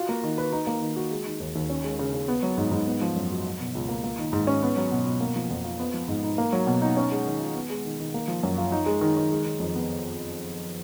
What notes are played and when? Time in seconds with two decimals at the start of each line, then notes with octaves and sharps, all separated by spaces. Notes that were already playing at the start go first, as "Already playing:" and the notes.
Already playing: F4 F#4
0.09 A#3
0.23 D#3
0.38 B4
0.52 D#4
0.67 A#3
0.81 D#3
0.96 F#4
1.11 G#3
1.26 D#3
1.40 D#2
1.55 D#2
1.70 C#4
1.84 G#3
1.99 C#3
2.14 C#3
2.28 B3
2.43 F#3
2.57 G#2
2.71 G#2
2.87 B3
3.01 F3
3.16 F#2
3.30 F#4
3.45 F#3
3.60 B2
3.75 C#2
3.89 A#3
4.04 A#3
4.18 D#3
4.33 G#2
4.47 C#4
4.62 B3
4.77 F#3
4.91 B2
5.06 B2
5.20 A#3
5.36 F3
5.50 F2
5.64 F4
5.79 B3
5.94 F3
6.08 G#2
6.23 D#4
6.38 A#3
6.53 F#3
6.67 B2
6.82 D#4
6.97 C#4
7.12 G#3
7.26 D#3
7.40 F4
7.55 B3
7.70 G#3
7.85 D#3
7.99 D#3
8.14 A#3
8.28 F3
8.43 F#2
8.58 F4
8.72 D#4
8.86 G#3
9.01 D#3
9.17 D#3
9.31 G#3
9.45 D#3
9.60 F2
9.75 B3